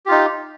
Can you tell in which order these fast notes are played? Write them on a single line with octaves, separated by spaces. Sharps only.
G4 F4 D#4